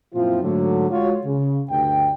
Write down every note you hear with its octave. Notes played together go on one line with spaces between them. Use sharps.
F#2 A#2 F3 C4 E4 F4
G#2 D3 F#3 A3
G#3 F4 F#4 C#5
C#3
D2 G2 G5